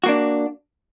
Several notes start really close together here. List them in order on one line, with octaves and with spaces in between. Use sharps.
F#4 A#3 D4